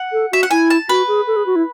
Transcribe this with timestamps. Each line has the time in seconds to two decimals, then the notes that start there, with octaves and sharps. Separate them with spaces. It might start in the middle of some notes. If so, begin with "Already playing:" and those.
Already playing: F#5
0.12 A4
0.32 F#4 E5
0.43 F#5
0.50 E4 G#5
0.70 A5
0.89 F#4 B4
1.08 G#4
1.27 A4
1.36 G#4
1.46 F#4
1.56 E4